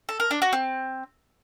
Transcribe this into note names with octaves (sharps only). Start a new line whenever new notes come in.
A4
A#4
D4
F#4
C4